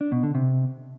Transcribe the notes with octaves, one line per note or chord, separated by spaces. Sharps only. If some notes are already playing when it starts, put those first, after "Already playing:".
D4
B2
D3
C3